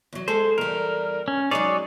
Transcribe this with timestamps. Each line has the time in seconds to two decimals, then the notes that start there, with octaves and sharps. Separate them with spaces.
0.13 E2 F#3
0.28 G#3 G#4 A4 C5
0.58 E2 G3 A#4
1.28 C#4
1.51 F#3 G#3 D#4 G#4 C#5 D5